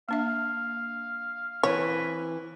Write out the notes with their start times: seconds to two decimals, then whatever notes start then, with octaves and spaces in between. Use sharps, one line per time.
0.09 A#3 D4 E5 F5
1.63 E3 C4 B4 C#5